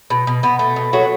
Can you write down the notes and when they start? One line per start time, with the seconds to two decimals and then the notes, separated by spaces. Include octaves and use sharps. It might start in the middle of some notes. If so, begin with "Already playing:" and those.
0.10 B2
0.27 B2
0.43 B2 B3
0.59 A3
0.76 B2
0.93 F#3 A3 F#4